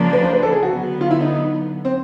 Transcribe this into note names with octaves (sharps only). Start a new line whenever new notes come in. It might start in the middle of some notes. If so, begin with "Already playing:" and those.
Already playing: C#3 F3 A#3 D4
B4
C5
B4
A4
G#4
F#4
D3 F#3 B3
F4
E4
D#4
C4